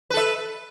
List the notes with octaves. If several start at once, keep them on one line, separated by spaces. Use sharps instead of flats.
A4 B4 E5